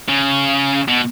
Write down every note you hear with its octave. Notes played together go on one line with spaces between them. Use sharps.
C#3
B2